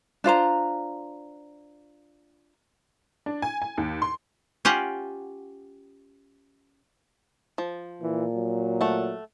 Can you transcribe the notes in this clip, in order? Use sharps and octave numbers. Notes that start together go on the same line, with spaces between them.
D4 F4 C5 A#5
D4
G#5
G#5
D#2
C6
C#4 F4 G4 F#5
F3
A#2 E3
F#3
A3 F#5